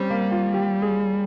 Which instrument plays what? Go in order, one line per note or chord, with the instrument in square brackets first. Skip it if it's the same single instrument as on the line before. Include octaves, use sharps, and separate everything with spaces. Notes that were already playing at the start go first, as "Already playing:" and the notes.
Already playing: [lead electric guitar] G3 [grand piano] C4 C#4
[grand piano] A#3
F4
G4
G#4